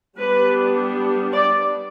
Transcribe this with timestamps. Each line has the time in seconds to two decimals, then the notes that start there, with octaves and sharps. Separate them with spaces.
0.18 G3 B3 D4 B4
1.33 D5